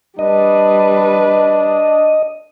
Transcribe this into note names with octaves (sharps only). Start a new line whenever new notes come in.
G3 D4 B4 D#5